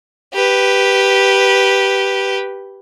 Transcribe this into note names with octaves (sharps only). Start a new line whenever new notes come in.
G4 B4